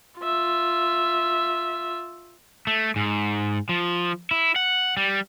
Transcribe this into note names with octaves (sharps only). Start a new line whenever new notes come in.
F4 E5
A3
G#2
F3
E4
F#5
G3